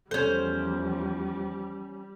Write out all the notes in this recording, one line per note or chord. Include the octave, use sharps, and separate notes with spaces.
E2 F3 G3 C#4 A4 C5